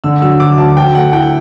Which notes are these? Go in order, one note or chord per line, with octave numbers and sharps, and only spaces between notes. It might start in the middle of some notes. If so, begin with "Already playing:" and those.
D3 E6
F#3 E6
D2 D6
D2 A5
F#3 G5
A3 F#5
E4 G5